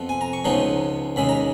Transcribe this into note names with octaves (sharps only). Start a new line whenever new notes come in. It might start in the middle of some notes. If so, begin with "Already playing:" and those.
Already playing: F2 F3 B3
G#5
A#5
C#6
C#2 C#3 F3 B3 D#4
D#2 C#3 G#3 B5
A#5